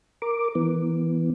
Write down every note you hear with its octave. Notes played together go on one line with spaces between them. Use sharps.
A#4 D6
E3 B3